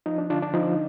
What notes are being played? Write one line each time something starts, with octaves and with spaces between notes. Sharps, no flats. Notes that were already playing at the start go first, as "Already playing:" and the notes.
F3 D#4
D4
D3 D4 F4
D4
F3 D#4